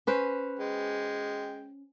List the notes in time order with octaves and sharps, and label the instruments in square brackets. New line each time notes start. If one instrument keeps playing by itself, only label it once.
[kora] C#4 B4 C5
[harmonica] G#3 G5